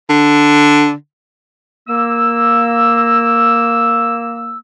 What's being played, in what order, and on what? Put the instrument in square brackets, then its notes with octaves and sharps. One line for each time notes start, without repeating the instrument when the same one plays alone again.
[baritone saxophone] D3
[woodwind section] A#3 E6